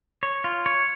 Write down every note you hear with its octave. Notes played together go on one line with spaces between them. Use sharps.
C#5
F4
C#5